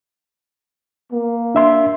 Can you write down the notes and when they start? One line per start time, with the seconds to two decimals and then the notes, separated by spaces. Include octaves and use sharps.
1.12 A#3
1.55 D4 E5 C6